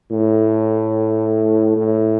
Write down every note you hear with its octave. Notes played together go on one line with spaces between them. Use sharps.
A2
A2